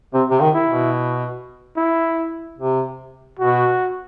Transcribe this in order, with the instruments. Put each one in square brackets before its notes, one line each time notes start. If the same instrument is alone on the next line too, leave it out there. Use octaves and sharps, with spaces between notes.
[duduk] C3 [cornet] C4
[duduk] C3
D#3
[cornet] E4
[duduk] B2
[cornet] E4
[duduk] C3
[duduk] B2 [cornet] F#4